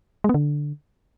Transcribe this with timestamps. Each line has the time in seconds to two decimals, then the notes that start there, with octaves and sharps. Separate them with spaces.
0.24 G#3
0.29 B3
0.34 D3